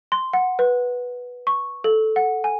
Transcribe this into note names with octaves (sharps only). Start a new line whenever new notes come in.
C6
F#5
B4
C#6
A4
F#5
G#5